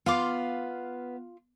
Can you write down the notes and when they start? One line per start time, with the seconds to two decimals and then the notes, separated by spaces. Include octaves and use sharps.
0.06 B3 F4 F5 C6 D6